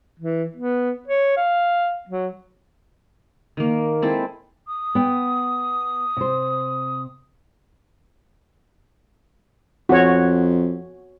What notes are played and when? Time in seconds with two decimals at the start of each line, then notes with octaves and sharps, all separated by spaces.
0.19 E3
0.56 B3
1.08 C#5
1.37 F5
2.09 F#3
3.57 D#3 A#3
4.02 G#3 C4 E4 A4
4.68 D#6
4.95 B3 G5
6.17 C3 C5
9.89 F2 F#4 C#5